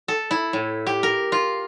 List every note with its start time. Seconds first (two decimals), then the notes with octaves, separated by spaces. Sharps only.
0.08 A4
0.31 E4
0.53 A2
0.87 G4
1.03 A#4
1.32 F4